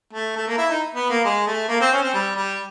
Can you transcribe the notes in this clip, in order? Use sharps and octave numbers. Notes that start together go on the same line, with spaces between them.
A3
A3
A#3
E4
D#4
B3
A#3
G#3
A3
A#3
C4
C#4
C4
G3
G3